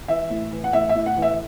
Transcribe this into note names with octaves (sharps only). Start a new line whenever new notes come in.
E3 E5
A2
E3
F#5
A2 E5
E5
A2
F#5
E3
E5